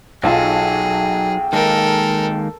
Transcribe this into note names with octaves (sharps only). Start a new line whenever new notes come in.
B1 F#3 D#4 F4 G#4 A4 G5
D#3 G#3 A#3 A4 A#4